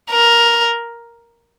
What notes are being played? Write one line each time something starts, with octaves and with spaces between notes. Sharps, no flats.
A#4